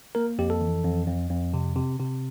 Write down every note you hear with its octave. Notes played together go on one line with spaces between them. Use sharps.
A#3 A#4
F2 G4
A4
E3
F2
F2
F2
C3
C3
C3